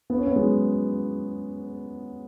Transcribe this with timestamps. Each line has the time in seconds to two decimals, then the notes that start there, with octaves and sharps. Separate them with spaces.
0.10 B3
0.18 C#4
0.27 B3
0.36 G#3
0.44 F#3